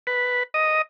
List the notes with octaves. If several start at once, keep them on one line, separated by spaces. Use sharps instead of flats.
B4
D#5